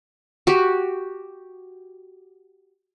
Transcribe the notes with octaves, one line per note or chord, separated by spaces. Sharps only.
F#4 G4